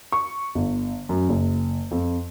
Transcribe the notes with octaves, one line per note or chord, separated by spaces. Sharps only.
C#6
G1
F#2
F#1
F2